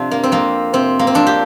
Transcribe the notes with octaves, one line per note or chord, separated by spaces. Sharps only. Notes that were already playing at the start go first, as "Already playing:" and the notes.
Already playing: F2 C3 D4 F4
A#3
C4
F2 A#3
C3 C4
A#3
C4
F2 D4
G4